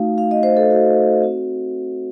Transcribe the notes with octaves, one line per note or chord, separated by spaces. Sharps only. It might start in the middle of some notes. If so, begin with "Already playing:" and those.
Already playing: A3 D#4 F#4 F5
F5
D#5
C5
A4
F#4
C4 F#4